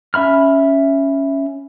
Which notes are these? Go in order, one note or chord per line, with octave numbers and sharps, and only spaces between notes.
C#4 E5 B5 F6